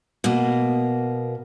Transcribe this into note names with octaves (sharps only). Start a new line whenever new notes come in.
B2 A#3